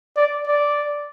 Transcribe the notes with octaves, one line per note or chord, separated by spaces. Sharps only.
D5
D5